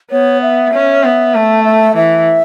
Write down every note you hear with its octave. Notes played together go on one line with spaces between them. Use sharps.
B3 C#5
E5
C#4
B3
A3
E5
E3 E5